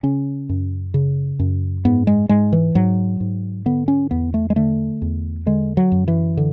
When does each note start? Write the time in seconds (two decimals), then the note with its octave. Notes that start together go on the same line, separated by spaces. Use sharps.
0.03 C#3 C#4
0.49 F#2
0.94 C#3
1.39 F#2
1.85 G#2 B3
2.07 G#3
2.29 G#2 G#3
2.53 E3
2.75 G#2 F#3
3.20 G#2
3.66 D3 B3
3.88 C#4
4.11 E2 B3
4.34 A3
4.50 G#3
4.56 D3 A3
5.02 E2
5.46 D3 G#3
5.77 F#3
5.92 F#2
6.08 E3
6.37 D3